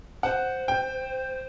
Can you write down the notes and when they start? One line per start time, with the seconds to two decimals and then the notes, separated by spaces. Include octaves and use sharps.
0.23 C5 F#5
0.68 G5